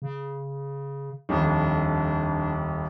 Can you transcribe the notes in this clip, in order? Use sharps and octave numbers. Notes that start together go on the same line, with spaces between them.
C#3
D#1 F2 D4